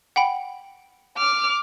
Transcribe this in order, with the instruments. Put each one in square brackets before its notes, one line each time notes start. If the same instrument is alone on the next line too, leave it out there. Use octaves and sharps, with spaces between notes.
[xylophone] F#5 G5 B5
[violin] D6 F6